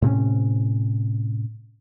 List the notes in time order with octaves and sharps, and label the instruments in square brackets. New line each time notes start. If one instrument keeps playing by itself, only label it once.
[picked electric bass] A2 C3 C4 C#4